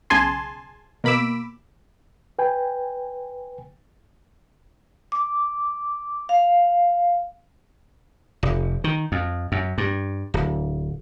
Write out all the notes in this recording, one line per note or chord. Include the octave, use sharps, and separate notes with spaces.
B1 C#3 G#4 G#5 A5 C6
B2 A#3 B5 D6 E6
B4 G5 G#5
D6
F5
F1
D#3
F2
F#2
G2
D1